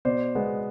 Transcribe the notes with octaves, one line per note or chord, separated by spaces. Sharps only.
B2 C5 D5
G#3 B3